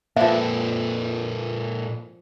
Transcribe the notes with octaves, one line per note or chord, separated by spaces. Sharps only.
A#2 F3 A#3 C4 D4 A4 B4 E5